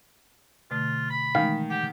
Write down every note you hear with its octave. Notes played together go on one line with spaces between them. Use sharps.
B2 D3 A3 F4
B5
D#3 E3 G#3 A3 F5
G4 F#5